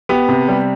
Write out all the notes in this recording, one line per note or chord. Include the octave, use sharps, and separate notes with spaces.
B3 G4
C3
G3